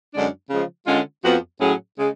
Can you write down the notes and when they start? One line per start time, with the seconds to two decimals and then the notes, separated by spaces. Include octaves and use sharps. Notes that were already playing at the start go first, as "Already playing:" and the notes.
0.14 F#2 D3 G#3 D4
0.50 C#3 F3 G#3
0.87 D3 G#3 C#4 F4
1.24 F2 F3 B3 F#4
1.60 A2 F#3 C#4 G#4
1.98 C#3 G#3